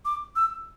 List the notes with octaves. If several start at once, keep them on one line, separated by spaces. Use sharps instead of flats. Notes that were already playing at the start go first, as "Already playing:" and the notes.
D6
E6